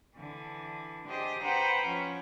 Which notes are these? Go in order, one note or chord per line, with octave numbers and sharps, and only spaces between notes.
D3 E3
D4 G4 G#4 C5 D#5
B4 C5 F#5 G5 A#5 B5
F3 C#4